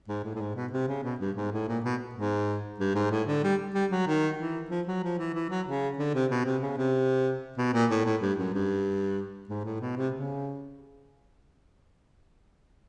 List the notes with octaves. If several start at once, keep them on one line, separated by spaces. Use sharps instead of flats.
G#2
A2
A2
G#2
B2
C3
C#3
B2
G2
G#2
A2
A#2
B2
G#2
G2
G#2
A2
D3
G3
G3
F#3
D#3
E3
F3
F#3
F3
E3
E3
F#3
C#3
D3
C3
B2
C3
C#3
C3
B2
A#2
A2
A2
G2
F#2
G2
G#2
A2
B2
C3
C#3